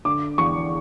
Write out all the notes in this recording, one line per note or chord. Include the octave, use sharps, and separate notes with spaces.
D3 D6
E2 C#6